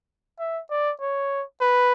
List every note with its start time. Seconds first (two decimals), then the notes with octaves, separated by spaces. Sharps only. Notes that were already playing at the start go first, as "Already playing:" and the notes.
0.39 E5
0.70 D5
1.01 C#5
1.61 B4